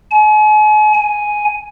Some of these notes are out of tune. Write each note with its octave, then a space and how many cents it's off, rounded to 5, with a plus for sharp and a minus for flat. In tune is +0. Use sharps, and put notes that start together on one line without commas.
G#5 +40
G#5 +5